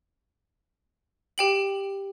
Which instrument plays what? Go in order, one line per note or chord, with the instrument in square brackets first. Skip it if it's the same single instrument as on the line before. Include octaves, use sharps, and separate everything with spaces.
[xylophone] G4 G5 F#7